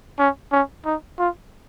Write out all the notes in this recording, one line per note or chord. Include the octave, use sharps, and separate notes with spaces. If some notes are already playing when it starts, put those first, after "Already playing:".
C#4
C#4
D#4
F4